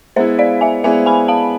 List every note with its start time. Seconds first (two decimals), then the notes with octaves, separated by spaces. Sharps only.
0.16 G#3 B3 E4 C5 E5
0.39 D5 F5
0.61 E5 G#5
0.84 G#3 B3 E4 E5 G#5
1.06 G#5 B5
1.28 F5 A5